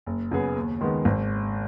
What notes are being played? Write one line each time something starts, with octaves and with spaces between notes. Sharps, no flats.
F#1
F#2 C#3 B3 G#4
D#2
D#3 G#3 B3
G#1